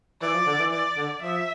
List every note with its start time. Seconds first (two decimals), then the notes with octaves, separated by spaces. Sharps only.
0.22 E3 D5
0.34 F3
0.46 D3
0.59 E3
0.72 E3 D5
0.97 D3
1.22 F3 E5